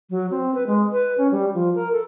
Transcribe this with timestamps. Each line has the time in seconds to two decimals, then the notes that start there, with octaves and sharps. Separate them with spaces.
0.10 F#3
0.31 C4
0.55 B4
0.67 G#3
0.92 B4
1.18 C#4
1.31 G3
1.54 F3
1.75 A#4
1.92 A4